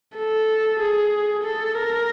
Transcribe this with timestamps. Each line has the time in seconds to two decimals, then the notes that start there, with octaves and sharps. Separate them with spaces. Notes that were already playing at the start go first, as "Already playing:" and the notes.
0.17 A4
0.80 G#4
1.43 A4
1.75 A#4